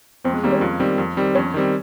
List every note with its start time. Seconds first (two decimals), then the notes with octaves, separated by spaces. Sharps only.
0.24 F2 C4
0.33 G#3
0.43 D#3 G3 A#3 C4
0.52 C#4
0.61 F2 F4
0.80 D#3 G3 C4
0.98 F2
1.17 D#3 G3 C4
1.35 F2 C#4
1.54 D#3 G3 C4